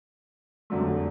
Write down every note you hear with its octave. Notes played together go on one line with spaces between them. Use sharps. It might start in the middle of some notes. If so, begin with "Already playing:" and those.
F1 F2 D3 F#3 A3